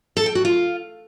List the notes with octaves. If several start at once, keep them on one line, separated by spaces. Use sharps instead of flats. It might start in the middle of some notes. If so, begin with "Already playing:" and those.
A4
G5
F#4
F4